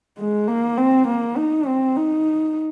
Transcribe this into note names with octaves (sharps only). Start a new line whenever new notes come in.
G#3
A#3
C4
A#3
D#4
C4
D#4